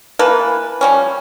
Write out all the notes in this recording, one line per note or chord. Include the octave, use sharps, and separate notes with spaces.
E3 A#3 B4 A5
F3 G3 C#4